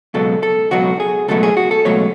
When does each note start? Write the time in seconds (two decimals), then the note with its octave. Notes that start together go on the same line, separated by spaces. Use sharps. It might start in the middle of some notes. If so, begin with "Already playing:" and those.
0.14 C#2 B2 F#3 A4
0.43 A4
0.71 C#2 B2 F#3 F#4
1.00 G#4
1.28 C#2 B2 F#3 A3 A4
1.43 G#4
1.57 F#4
1.71 A4
1.85 C#2 B2 F#3 A3 C#5